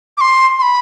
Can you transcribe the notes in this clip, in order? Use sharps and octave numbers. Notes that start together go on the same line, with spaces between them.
D6
C6
C6
B5